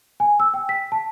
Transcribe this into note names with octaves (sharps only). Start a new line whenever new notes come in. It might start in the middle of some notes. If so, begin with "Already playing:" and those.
G#5
E6
G5
B6
A5